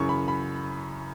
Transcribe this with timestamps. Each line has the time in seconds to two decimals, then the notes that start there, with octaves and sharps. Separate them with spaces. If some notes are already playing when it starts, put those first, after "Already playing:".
Already playing: F#2 C#3 E3 C#6
0.09 B5
0.28 B5